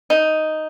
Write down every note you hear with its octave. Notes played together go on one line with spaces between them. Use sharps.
D#4